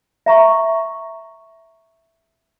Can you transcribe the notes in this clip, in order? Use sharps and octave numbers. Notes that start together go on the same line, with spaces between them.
E5 A#5 C#6